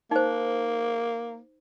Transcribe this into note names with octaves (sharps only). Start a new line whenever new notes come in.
A#3 D#4 C5